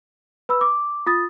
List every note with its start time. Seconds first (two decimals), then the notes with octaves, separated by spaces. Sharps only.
0.49 B4 B5 E6
0.61 D6
1.06 F4 D#6 A6